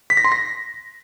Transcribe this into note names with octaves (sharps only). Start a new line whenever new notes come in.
B6
A#6
C6
A#6